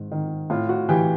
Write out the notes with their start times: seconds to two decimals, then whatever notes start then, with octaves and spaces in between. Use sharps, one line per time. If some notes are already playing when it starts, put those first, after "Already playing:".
Already playing: G#2 D#3
0.11 D#3
0.50 A2 F4
0.69 F#4
0.89 E3 G4